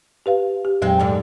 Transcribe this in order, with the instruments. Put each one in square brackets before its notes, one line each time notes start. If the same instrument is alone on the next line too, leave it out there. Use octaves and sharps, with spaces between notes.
[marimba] G4 B4 F5
G4
[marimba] F2 A#2 F#3 [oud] G#3 C4
[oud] G#2 D3